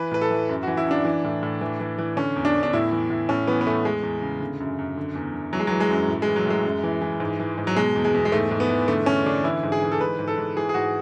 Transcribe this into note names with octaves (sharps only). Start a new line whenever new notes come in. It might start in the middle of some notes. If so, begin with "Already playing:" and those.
Already playing: E3 B4
A2 B4
A4
E3
F#2
E3 F#4
E4
F#2 D4
E3
A2
A2
E3
E3
E3
D3 C#4
E2
D4
E2
D4
A2 E4
E3
A2
A2 C#4
E3 B3
B3
A2 A3
E2 G#3
E2
C#3
D3
F#2
F#2
D3
E2
D3
E3 F#3
G#3
E3 F#3
G#3
F#2
A2
G#3
E3
F#3
A2 G#3
F#2
E3
E3
G#2
E3
G#2
F#3
B2 G#3
E2
G#3
E2
G#3
G#2 A3
G#2
B3
E3
D3 A3
D3 C#4
D3 D4
E3 E4
G#2
G#4
E3
A4
G#2 B4
G#2
A4
G#2
E3 G#4
G#4
G#2 F#4